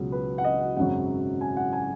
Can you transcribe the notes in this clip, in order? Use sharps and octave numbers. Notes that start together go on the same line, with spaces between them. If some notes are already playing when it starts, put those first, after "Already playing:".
Already playing: C#2 B2 F#3
B4
F#5
D#5
F#5
G#1 F#2 C#3 F#3 F#5
G#5
F#5
G#5